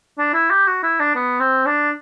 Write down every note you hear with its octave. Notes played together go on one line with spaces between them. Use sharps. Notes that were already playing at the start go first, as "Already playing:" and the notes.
D4
E4
G4
F#4
E4
D4
B3
C4
D4